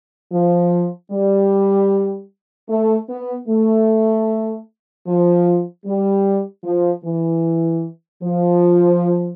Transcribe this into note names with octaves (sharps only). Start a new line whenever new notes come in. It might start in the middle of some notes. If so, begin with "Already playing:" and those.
F3
G3
A3
B3
A3
F3
G3
F3
E3
F3